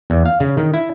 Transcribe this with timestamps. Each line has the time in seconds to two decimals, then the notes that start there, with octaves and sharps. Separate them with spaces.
0.10 E2
0.26 F5
0.40 C#3
0.57 D#3
0.74 E4